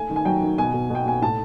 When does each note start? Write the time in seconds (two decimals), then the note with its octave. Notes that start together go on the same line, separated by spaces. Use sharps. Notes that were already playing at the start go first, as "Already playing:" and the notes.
Already playing: A3 G#5
0.10 D#3
0.16 G#5
0.25 F#3 G5
0.42 D#3
0.58 B2 G#5
0.73 B2
0.90 B2 G5
1.06 B2 G#5
1.22 A2 A5